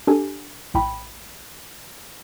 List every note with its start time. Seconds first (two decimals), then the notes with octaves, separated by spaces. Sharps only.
0.07 D4 G4 A4 G#5
0.74 A#1 A2 G5 B5